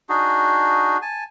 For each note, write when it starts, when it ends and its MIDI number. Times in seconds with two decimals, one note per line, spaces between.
0.09 0.97 62
0.09 0.97 63
0.09 0.97 66
0.09 0.97 68
1.02 1.24 80
1.02 1.24 81